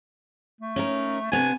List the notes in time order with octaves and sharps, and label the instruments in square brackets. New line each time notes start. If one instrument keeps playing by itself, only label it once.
[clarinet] A3
[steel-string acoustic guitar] C#4 D#4 A#4
[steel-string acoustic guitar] C3 B3 D4 [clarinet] G#5